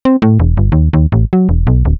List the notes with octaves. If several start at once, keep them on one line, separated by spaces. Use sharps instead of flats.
C4
A2
E1
G1
D#2
D#2
A1
F#3
E1
B1
D1